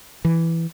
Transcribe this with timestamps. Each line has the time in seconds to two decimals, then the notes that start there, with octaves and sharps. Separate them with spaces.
0.25 E3